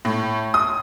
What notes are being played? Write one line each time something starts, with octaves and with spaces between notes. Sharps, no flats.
A2
D#6